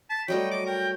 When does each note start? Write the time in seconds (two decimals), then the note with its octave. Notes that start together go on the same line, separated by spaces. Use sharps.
0.10 A5 B6
0.28 F#3 G3 A3 D#5 G5
0.51 D6
0.66 A#4 G5